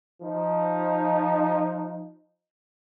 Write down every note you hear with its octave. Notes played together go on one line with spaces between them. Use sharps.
F3 D#4